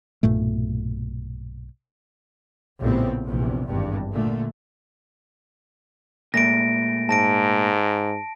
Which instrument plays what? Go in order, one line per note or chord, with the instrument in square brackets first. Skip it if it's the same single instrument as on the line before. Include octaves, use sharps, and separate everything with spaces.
[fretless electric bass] B1 G2 A#2 A3
[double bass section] A#1 A2 C#3 G3 B3 C4
A#1 E2 C3
G#1 E2 G2
A#2 D3 A3
[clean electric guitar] A#2 G#3 A3 [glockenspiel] A#6 D7
[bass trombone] G#2 [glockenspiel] A5 A#6 D7